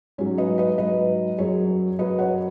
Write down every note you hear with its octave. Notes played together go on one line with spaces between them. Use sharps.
G#2 F#3 C#4
B4 D#5
B4 D#5
G#2 F#3 B4 D#5
F#2 F#3 G#4 C#5
F#2 F#3 B4 D#5
C#5 F#5